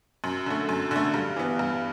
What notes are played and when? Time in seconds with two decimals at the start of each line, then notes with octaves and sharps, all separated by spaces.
0.24 F#2
0.46 D3 A3
0.69 F#2
0.91 D3 A3
1.14 G2
1.36 E3 B3
1.59 G2